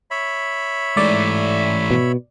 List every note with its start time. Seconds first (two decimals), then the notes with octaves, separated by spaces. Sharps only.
0.11 C#5 E5 B5
0.97 G#2 E3 A3 D5
1.91 B2